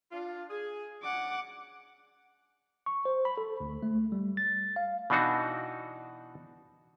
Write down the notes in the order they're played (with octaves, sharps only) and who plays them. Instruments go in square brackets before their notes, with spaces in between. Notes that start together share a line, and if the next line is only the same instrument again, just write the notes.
[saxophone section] D4 F4
G#4
[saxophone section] F#3 C#4 D4 [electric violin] F#5 D6
[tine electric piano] C#6
C5
B5
A4
D2
A3
G3
A6
F5
[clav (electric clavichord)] B2 E3 D4 D#4 F#4